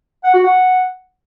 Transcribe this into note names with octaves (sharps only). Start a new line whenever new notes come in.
F#5
F#4
F#5